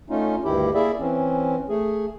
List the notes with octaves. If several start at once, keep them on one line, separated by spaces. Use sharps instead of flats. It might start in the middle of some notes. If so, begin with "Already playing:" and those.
A3 C#4 D#4 F4
D2 G2 D#3 E4 G4
A#3 E4 G#4 D5 E5
E3 C4 C#4
A3 G#4